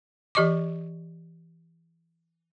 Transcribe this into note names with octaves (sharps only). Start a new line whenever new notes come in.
E3 G4 D#5 C#6 D6